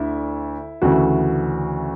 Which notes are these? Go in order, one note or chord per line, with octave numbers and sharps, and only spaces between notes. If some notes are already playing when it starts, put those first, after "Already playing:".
Already playing: D2 D3 E4
D2 C#3 E3 F#4